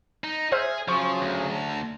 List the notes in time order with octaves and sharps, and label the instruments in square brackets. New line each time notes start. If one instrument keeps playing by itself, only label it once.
[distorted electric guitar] D#4
[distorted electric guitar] G#4 [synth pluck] C5 E5 F6
[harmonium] C#3 F#3 G#4 [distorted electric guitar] F3 [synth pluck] C5 C#6
[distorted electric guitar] D2
[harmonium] A5 A#5